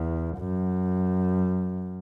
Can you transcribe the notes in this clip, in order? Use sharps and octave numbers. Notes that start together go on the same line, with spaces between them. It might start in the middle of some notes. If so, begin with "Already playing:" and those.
Already playing: E2
F#2